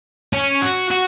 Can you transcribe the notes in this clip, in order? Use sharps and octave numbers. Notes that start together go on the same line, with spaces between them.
C#4
F#4
F#4